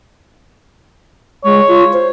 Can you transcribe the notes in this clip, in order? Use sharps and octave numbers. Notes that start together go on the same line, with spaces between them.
G#3 C#5
F4
C5